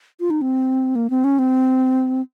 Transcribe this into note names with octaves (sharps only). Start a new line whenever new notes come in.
F4
D#4
C4
A#3
C4
C#4
C4